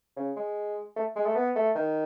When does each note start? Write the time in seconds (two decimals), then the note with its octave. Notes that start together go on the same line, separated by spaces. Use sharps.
0.17 C#3
0.37 G#3
0.96 A3
1.16 G#3
1.26 A3
1.35 B3
1.55 A3
1.75 D#3